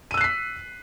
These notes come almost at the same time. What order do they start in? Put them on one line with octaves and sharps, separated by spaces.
D#7 E6 F#6 C7 B6